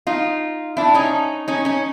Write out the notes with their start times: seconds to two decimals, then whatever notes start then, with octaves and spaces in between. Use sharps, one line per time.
0.07 D#4 F4
0.77 D4 E4
0.94 C#4 D#4
1.48 C#4 D#4
1.65 C#4 D#4